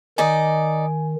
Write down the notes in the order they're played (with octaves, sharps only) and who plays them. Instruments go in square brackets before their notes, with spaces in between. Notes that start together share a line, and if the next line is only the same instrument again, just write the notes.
[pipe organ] D#3 [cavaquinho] D#4 D5 D#5 [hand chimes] G#5